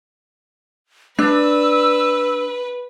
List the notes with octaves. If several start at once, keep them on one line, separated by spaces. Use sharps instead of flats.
D4 B4 E6